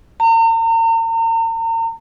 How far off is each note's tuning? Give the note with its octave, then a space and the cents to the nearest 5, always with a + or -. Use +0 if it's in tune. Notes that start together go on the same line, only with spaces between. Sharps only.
A#5 -40